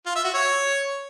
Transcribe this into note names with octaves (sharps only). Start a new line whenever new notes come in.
F4
E5
F#4
C#5